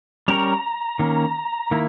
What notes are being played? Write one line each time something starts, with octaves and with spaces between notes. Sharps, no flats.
G3 C#4 G4 A#4 C#5 A#5
D#3 A#3 C#4
D#3 A#3 E4